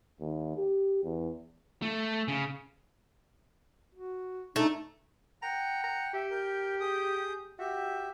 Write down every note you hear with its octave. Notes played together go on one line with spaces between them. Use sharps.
D#2
G4
E2
A3
C#3
F#4
A3 D4 D#4
F#5 G5 A#5
A#5
G4 E5
A#4 G6
G#4 D#6 G6
F#4 G4 E5